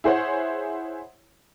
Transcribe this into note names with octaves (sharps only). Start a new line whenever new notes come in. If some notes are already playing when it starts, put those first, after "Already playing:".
E4 G#4 C5 C#5 F#5